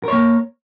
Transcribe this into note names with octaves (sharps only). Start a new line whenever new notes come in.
A#3 A#4 C#5